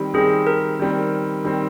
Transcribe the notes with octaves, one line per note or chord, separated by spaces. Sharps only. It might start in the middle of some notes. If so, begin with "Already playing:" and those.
Already playing: D#3 G3 C4
D#3 G3 C4 G#4
A#4
D#3 G3 C4
D#3 G3 C4